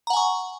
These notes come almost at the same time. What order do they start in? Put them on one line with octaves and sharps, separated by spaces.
A#5 F#5 G#5 C#6